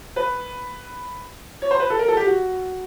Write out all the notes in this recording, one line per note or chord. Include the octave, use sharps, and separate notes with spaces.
B4
C#5
C5
B4
A4
A#4
A4
G4
F#4